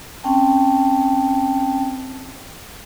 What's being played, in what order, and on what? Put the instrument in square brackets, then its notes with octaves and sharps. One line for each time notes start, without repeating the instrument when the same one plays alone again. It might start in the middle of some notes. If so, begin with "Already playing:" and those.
[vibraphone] C4 C#4 G5 A5